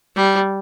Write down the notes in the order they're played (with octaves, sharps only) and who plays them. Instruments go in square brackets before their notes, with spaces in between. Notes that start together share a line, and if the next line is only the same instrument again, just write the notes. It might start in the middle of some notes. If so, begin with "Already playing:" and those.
[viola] G3